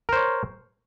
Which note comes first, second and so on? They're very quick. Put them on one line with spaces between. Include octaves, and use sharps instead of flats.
A#4 C5 C#5